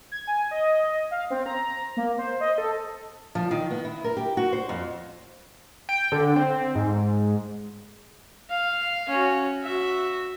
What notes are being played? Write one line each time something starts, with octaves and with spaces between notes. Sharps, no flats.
G#6
G#5
D#5
F5
C4
A#5
A#3
C5
D#5
A4
F3
D#3
B3
E4
A#4
G4
F#4
C5
F2
G5
D3
C4
G#2
F5
C#4 F#4
F#4 E5